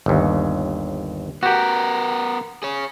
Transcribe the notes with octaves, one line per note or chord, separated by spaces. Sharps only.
G1 D#2
B3 F#4 G4 A#4
G#4 C#5